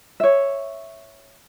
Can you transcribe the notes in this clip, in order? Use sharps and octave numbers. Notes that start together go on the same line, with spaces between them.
C#5 E5